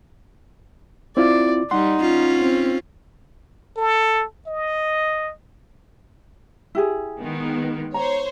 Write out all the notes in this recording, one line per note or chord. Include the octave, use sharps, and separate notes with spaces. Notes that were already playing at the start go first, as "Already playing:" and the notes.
C4 E4 F4 D5
G3 D#4 F#5 C6
C#4 F4
C4
A4
D#5
E4 G4 G#4
D#3 G#3 B3
C5 C#5 A#5